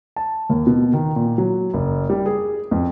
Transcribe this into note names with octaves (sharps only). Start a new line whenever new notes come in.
A5
D#2
B2
D#3
A#2
F#3
F#1
G3
G#4
F2